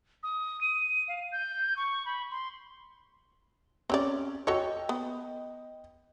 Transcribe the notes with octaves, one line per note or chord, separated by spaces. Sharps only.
D#6
D#7
F5
G6
C#6
B5
C6
C4 C#4 G4 D5
F#4 A4 C#5 D#5 G5
B3